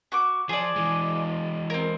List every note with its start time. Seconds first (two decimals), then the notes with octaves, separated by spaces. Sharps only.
0.12 F#4 C#6 D6
0.49 F3 G#4 D5
0.76 E3 G#3
1.70 C4 A#4